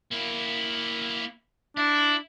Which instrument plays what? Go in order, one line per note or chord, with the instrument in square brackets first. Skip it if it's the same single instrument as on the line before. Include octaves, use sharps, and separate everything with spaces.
[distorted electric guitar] A#3 E4
[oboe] D4 [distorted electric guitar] E4